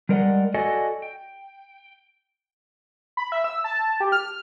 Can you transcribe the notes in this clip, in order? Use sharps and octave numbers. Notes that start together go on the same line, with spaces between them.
G3 G#3 A#4 D5 D#5 F#5
F#4 A4 D5 D#5 F#5 G#5
G5
B5
E5
E6
A5
G4
F6